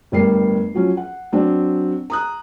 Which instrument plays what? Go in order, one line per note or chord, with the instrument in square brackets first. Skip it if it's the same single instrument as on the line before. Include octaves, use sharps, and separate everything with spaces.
[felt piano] G1 A2 G3 A#4 C7
F3 F#3 C#4
F#5
F#3 C4 D4
A#5 D#6 F#6